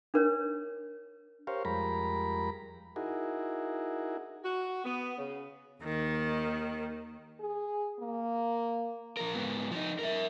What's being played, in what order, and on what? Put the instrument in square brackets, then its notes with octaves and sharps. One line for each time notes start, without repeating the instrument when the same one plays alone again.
[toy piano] D4 A#4 C#5
[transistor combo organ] G4 A#4 C5 C#5 F5
F2 G3 G#3 A#4 A#5 B5
D#4 E4 F#4 G#4 A#4
[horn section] F#4
B3
C#3
[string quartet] D#2 D#3
[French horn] G#4
A#3
[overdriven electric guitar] F3 A#4
G#2 B3
F3 D#4
A#4 E5